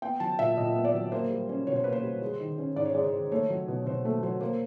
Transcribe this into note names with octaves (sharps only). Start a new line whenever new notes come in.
B3 G5
F#3 A5
A#2 E5
A#2 D#5
B3
D5
F#3
A#3 C5
G3
C#4
B2 C#5
C5
A#3 B4
C5
G3
G#3
D#3
C#4
G#2 D5
C#5
G#3 D5
C5
D#3
A3 C#5
F#3
B2
B2 C5
A3
F#3 C5
A#3 C5